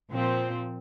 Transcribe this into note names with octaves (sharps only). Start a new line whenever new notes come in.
A#2 F3 C4